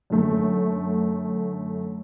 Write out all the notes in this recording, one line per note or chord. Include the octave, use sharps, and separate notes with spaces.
F#2 D3 A3